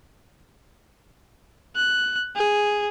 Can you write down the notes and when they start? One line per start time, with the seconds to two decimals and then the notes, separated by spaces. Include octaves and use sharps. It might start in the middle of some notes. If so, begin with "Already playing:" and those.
1.76 F#6
2.36 G#4